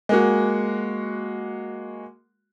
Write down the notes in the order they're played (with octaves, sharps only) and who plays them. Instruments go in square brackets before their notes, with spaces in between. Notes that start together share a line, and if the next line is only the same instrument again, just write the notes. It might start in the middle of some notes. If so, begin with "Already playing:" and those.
[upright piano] G#3 A#3 F#4